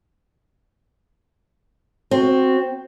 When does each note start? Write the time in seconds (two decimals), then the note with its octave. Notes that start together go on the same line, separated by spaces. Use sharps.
2.11 C4 F#4